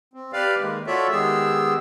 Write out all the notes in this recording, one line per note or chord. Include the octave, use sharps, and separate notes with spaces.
C4
G4 B4 D5 F5
D#3 G#3 A#3
F4 F#4 A4 C#5 D5 E5
D#3 G#3 B3 G4 G#4 E6